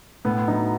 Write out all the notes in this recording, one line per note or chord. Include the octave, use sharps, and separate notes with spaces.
A2 B3
F#3 D#4